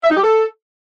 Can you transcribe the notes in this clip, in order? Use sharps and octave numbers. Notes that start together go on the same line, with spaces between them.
E5
D#4
G4
A4